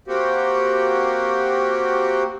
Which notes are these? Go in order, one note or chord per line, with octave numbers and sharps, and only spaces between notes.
A#3 C4 F#4 G4